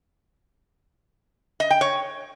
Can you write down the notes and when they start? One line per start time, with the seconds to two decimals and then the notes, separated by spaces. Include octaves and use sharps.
1.60 D#5
1.70 G5
1.81 C#5